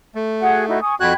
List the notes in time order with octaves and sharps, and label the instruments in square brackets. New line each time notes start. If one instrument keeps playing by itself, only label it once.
[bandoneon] A3
[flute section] F#4 G#4 F#5
D#4 E4 F#4
G#5 C#6 D#6
[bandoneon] F2 F#4 F#6 [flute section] G5 B5 G#6